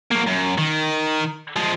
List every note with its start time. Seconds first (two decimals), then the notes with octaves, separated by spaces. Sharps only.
0.11 F#3 A#3
0.27 F#2
0.58 D#3
1.57 F3 G#3